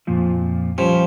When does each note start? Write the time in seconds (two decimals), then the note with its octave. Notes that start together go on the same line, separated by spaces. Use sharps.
0.07 F2 A#2 F3
0.78 F3 G3 C#4 G4